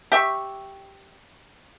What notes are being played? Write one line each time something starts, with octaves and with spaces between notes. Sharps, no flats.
G4 E5 C#6